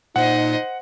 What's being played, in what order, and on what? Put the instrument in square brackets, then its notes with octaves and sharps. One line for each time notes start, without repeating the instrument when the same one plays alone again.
[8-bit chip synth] A#2 [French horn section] D#4 [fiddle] C5 D#5 [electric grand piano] F#5